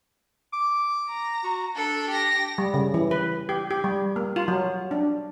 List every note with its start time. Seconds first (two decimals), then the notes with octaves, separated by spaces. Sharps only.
0.53 D6
1.08 A#5
1.44 F#4
1.77 D4 A4
2.12 G4 A#6
2.58 G3
2.74 C#3
2.94 E3
3.11 B4
3.49 G4
3.71 G4
3.84 G3
4.16 A#3
4.36 F4
4.48 F#3
4.91 D4